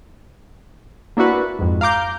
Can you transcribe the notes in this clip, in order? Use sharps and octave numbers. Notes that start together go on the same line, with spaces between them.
A#3 D4 E4 F#4 B4
F2 G#2
F5 A#5 D6 G6